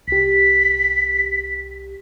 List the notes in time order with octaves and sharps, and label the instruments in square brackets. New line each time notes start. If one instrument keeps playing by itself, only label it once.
[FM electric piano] C2 G4 [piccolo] B6